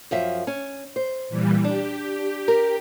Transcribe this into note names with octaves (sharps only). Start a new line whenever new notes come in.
F#2 F3 E5
C#4
C5
A#2 E3 G3
D4 G4
A#4